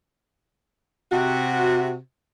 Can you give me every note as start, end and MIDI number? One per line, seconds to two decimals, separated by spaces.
1.11 1.96 48
1.11 1.96 66